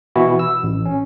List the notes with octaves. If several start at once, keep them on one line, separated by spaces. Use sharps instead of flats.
B2 E3 E4 F#4
E6
A1
C#4